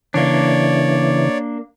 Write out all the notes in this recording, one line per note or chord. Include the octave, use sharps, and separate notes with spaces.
C#3 E3 A#3 D4 C#5 D5